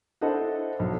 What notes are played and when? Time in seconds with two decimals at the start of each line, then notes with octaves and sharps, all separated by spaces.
0.21 D4 E4 A4 C5 D#5 F#5
0.79 B1